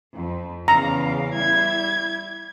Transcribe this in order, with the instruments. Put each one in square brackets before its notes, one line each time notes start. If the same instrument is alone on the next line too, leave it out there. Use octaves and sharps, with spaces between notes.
[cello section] F2
[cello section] E2 C#3 F5 [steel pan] A#5
[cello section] G3 E4 [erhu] G#6